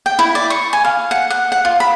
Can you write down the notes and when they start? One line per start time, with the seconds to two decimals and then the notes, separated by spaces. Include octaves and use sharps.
0.06 G5
0.19 E4
0.35 D5
0.50 C#6
0.73 G#5
0.85 F5
1.11 F#5
1.30 F#5
1.52 F#5
1.65 F4
1.80 B5